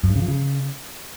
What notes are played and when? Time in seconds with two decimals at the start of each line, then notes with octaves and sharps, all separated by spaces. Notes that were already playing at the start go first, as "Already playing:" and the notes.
0.04 F#2
0.10 G2
0.16 C#3
0.22 F3
0.28 C#3